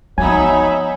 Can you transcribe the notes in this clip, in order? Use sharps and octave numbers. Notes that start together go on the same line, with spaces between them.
F3 F#3 B3 D#4 E5 G#5 B5